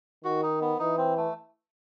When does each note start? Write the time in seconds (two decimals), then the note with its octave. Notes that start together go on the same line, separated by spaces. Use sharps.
0.24 D#3 F#4
0.43 D#4
0.61 B3
0.79 E3 D#4
0.98 C4
1.17 A3